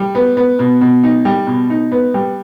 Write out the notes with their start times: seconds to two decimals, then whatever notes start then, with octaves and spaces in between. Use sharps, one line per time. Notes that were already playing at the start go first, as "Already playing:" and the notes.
Already playing: G3
0.15 B3
0.37 B3
0.59 B2
0.81 B2
1.04 D#4
1.25 G3
1.47 B2
1.70 D#4
1.92 B3
2.14 G3